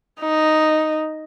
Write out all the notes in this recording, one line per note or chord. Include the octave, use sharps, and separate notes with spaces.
D#4